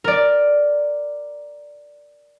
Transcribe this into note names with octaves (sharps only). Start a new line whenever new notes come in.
A#4 D5